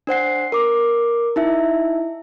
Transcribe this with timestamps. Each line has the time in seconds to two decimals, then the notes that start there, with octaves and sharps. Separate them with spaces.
0.07 D4 C5 F#5 C7
0.52 A#4 D6
1.36 D#4 E4 E5